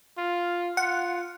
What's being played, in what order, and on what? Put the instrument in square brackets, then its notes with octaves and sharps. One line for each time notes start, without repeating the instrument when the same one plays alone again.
[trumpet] F4
[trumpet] F4 [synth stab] F#5